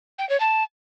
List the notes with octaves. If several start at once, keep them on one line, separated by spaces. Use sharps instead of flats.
G5
C#5
A5